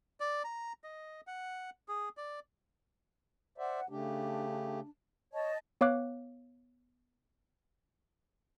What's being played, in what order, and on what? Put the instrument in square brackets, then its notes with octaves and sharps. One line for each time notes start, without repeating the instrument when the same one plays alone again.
[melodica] D5
A#5
D#5
F#5
G#4
D5
[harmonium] C5 D5 E5 [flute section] F#5
[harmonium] C#3 A3 G4 [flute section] D4
[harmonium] C#5 [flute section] D#5 A5
[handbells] B3 C#5 F5 D6 F#6